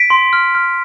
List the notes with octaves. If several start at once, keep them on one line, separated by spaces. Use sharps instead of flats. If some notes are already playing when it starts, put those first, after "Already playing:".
Already playing: B6 D7
C6
F6
F6